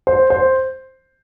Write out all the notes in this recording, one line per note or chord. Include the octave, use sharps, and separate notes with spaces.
C5
C5